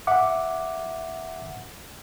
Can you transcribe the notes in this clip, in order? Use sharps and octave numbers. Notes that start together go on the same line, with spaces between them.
E5 F#5 D6